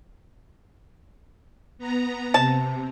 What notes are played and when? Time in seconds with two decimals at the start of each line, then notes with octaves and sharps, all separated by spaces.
1.78 B3 A#5
2.34 C3 A5